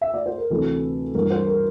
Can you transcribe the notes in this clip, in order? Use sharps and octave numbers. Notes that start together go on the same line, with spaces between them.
E5
D5
C5
A#4
D2 C3 E3 A4
G2 E3 A#4
C5
A#4